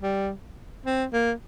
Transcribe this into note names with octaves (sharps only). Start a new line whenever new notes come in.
G3
C4
A#3